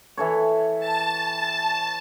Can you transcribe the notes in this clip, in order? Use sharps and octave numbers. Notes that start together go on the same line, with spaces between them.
E3 A4 C#5
A5